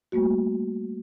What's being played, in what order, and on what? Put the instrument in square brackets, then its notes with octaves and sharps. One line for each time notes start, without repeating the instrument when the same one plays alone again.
[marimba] G3 A3 A#3 F#4